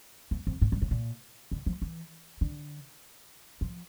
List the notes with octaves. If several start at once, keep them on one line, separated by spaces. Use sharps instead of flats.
F2
F2
A2
G2
A2
A#2
D3
F3
E3
D3
F3